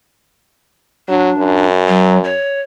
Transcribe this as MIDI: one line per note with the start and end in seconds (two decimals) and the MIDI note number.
1.08 1.31 54
1.08 1.65 62
1.37 2.33 42
1.88 2.19 54
2.24 2.60 73